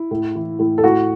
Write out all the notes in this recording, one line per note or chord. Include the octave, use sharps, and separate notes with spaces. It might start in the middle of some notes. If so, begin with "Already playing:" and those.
Already playing: E4
A2
E3
A2
A4
A2 F#4